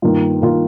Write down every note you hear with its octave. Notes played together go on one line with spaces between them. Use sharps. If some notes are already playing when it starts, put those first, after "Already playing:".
G2 D#3 A#3 F4
D#3 A#3 F4